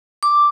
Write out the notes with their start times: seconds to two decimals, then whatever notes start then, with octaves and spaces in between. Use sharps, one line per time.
0.23 D6